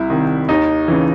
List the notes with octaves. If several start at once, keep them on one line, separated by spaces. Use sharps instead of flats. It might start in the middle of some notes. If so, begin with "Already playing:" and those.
Already playing: C2 E4
C3 D#3
D#2 D#4
C#3 E3